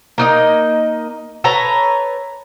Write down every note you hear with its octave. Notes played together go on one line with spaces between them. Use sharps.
A#3 D#4 D#5
A4 B4 C#5 A#5